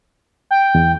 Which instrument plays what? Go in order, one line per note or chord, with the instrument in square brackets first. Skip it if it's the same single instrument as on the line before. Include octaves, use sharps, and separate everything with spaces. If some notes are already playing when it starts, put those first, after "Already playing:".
[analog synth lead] G5
[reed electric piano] E2